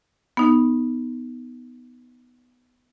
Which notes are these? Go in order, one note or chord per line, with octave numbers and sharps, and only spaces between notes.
B3 D#4